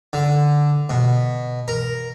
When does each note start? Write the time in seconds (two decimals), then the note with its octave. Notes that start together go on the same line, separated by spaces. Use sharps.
0.13 D3
0.90 B2
1.68 A#4